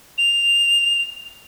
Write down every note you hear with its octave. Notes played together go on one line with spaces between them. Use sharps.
F7